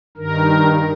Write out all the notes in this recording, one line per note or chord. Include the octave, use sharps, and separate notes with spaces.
G2 D#3 A#4